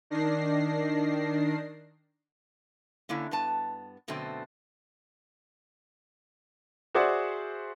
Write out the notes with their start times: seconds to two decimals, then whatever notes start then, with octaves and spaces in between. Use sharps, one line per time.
0.10 D#3 D4 A#6 C7
3.09 D3 A#3 C#4 E4
3.31 G2 B3 A5
4.08 F#2 B2 D3 A3 C4
6.95 F#4 G#4 C5 D5 E5 F#5